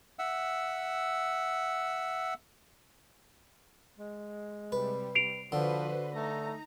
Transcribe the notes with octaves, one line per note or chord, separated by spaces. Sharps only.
E5 F#5 E6
G#3
C3 G3 B4
C7 D7 F7
D3 F3 F#4 B4 C5
A3 D#4 A#5